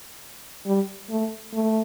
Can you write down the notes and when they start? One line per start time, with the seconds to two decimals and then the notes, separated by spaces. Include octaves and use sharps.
0.66 G3
1.10 A3
1.54 A3